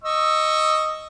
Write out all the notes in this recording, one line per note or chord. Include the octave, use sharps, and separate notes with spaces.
D#5 C#6 E6